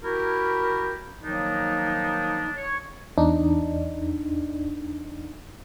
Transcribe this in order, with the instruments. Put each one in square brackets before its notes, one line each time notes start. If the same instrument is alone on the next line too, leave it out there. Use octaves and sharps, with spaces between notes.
[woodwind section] E4 F#4 G4 A#4
D#3 F3 F#3 A#3 D4 D#4
C#5
[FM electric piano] E2 D4 D#4